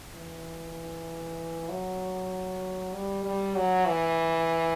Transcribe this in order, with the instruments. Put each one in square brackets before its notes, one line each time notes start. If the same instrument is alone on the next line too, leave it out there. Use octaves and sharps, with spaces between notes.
[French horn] E3
F#3
G3
G3
F#3
E3